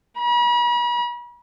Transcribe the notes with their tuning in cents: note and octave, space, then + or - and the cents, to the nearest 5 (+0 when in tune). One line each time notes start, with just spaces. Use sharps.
B5 -45